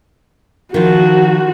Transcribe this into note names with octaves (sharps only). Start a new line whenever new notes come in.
D#3 F3 F#4